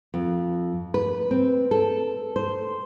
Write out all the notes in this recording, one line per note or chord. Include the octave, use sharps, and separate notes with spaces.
F2
B4
C4
A4
C5